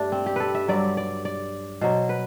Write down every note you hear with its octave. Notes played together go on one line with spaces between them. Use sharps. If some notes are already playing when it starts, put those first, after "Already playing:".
Already playing: G2 G3 A3 D4
C4
G4
A4 B4
E5
G2 F#3 D5
D5
D5
B2 F#3 C5
B4